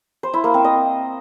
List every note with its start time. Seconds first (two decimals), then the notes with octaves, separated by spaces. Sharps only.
0.23 C5
0.34 E4
0.44 A#3
0.54 C4
0.64 D#5